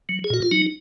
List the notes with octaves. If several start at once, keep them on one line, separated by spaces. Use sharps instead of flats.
F#3
G#4
A#2 F#4
F4
F#3 D#4